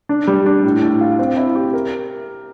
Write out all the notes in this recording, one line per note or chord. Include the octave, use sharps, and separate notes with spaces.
D4
G3
D4
A2
A2
F4
C4
E4
G4
A#4